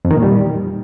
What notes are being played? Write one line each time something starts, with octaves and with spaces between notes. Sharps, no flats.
F2
D#3
A#2
G3